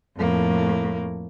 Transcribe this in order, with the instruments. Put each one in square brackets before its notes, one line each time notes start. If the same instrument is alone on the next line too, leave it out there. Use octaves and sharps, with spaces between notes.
[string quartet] F2 A2 A#3